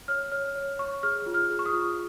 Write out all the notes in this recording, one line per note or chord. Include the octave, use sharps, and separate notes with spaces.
C#5 F6
C#5 F6
C#5
C#5 C#6
G#4 F6
F4
F6
G#4
C#6
D#6
F4